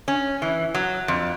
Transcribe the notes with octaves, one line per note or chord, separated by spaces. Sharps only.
C#4
E3
F#3
F2